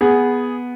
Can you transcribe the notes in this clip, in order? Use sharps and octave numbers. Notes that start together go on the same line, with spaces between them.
B3 G#4